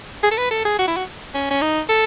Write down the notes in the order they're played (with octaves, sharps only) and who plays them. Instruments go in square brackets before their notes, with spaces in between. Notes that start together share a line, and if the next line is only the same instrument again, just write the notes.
[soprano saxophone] G#4
A4
B4
A4
G#4
F#4
E4
F#4
C#4
C#4
D#4
A4